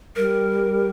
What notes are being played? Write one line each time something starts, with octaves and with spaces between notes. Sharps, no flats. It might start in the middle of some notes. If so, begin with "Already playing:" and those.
G3 A#4